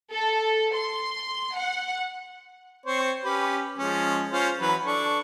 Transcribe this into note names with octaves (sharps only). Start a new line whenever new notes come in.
A4
C6
F#5
C4 C5 C#5
C#4 G4 B4
F3 G#3 C#4
C#4 F4 C5
E3 F#3 B4
D4 A4 C#6